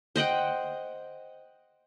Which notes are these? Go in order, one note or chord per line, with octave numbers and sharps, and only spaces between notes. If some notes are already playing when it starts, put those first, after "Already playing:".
C5 D#5 F#5 G5